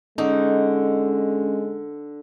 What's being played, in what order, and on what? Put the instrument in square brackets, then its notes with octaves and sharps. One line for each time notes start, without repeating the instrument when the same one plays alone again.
[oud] D3 [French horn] G#3 [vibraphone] C#4 [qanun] D#4